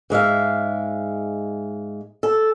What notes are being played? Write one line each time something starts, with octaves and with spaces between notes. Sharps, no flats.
G#2 G#3 E5 F5
A4